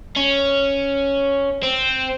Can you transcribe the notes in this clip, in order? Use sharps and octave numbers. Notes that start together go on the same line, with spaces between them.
C#4
C4